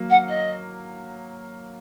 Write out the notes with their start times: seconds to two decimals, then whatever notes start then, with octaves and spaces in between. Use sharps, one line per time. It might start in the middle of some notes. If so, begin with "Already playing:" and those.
Already playing: F#3 A#3
0.10 F#5
0.28 D#5